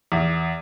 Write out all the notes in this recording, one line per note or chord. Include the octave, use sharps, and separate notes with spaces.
E2